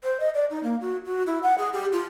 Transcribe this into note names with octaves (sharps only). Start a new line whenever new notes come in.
C5
D#5
D5
D#4
A#3
F#4
F#4
E4
F#5
G#4
G4
F4